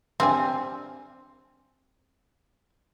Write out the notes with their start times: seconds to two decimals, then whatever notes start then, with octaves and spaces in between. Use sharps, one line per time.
0.20 G3 C4 D4 G#5